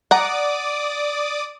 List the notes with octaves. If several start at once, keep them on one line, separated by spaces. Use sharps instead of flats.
D5 F#5 A#5 D6 D#6